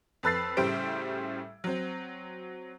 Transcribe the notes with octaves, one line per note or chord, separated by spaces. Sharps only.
F2 A4 B4 E6 A6 C7
A2 C#3 G3 G4 C5 D7
F#3 C4